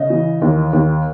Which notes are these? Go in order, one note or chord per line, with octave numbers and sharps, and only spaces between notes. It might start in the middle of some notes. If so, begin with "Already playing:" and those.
Already playing: C#3 D#5
E3
D#2
D#2